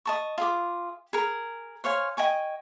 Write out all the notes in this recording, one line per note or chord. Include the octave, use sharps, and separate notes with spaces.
D#5 A5 C#6
F4 G#4 D6
G#4 A#4
C5 C#5 F5 G#5
D#5 G5 G#5 C#6